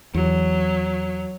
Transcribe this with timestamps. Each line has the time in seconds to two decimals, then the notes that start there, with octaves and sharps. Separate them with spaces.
0.15 E2 F#3